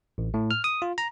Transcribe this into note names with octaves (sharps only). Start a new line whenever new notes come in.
A1
A2
F6
D#6
F4
A#5